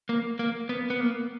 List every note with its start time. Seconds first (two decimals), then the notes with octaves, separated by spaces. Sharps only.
0.09 A#3
0.39 A#3
0.69 B3
0.90 B3
1.00 A#3